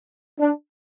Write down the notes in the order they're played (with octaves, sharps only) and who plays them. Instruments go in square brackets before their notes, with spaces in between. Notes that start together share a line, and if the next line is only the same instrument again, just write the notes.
[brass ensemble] D4